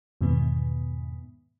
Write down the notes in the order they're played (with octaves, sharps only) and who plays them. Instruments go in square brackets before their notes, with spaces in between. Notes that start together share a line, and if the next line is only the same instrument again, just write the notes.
[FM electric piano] E2 G#2 B2 D#3 B3